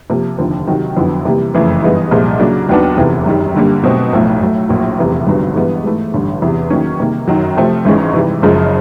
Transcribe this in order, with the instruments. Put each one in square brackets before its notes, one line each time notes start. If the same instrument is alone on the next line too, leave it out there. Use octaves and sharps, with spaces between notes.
[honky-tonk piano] C3 F3 A#3
F1 D#2 D3 F3
C3 D#3 F#3
F2 D3 F#3 B3 E4
C3 E3 G3 A#3
F#1 F2 C#3 E3 A3
G2 E3 G#3 B3 D#4
C2 A#2 F3 G#3
C#3 F#3 A#3 D4
D#2 D#3 F#3 B3 D4
F1 E2 C3 E3
F#2 D#3 G3
G2 D3 G3 A#3
B2 F#3 A3 C4 D#4
B1 A2 F3 A3
A2 F#3 A3
A#1 A2 F#3 A#3
F1 E2 C3 E3
G#1 G2 D3 F#3 B3
G2 E3 G#3 B3
G#2 E3 A3
A1 G2 D3
E2 C3 E3
D#3 F#3 A#3 C#4
C3 D#3 G3 A#3
F#2 D#3 F#3
C3 F3 A3 C4
G#1 G#2 E3 G#3 C#4
C3 E3 G3
F#1 F#2 C#3 F3 G#3